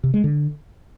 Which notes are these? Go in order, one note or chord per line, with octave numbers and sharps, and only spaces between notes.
C3
G#3
D3